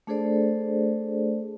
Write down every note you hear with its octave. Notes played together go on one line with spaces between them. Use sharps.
A3 D4 G#4 A4 C5 D5